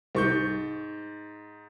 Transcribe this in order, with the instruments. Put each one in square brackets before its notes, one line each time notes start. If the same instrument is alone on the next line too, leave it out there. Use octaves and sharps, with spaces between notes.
[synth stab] C2 [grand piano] G#2 C#6 G6